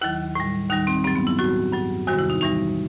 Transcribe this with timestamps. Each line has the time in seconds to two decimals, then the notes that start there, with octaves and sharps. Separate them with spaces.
0.01 D#2 D#3 F#3 E4
0.35 A2 G3
0.70 D#2 D#3 G3 D#4
0.87 C4
1.04 G2 F#3 C4
1.15 B3
1.27 E4
1.38 A2 F#3 F#4
1.73 G2 F#3
2.07 E2 C3 D#3 G3 F#4
2.19 E4
2.30 D#4
2.41 A2 E3 G3 D#4